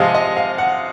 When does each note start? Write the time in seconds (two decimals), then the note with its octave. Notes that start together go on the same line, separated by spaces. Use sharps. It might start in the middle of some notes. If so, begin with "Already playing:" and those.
Already playing: C3 F3 G#3 D#5 F5
0.15 D#5
0.37 F5
0.58 F#5